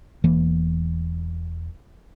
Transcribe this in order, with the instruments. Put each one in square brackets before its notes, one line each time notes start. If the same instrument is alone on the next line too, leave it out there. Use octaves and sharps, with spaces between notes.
[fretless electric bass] E1 E3 A#3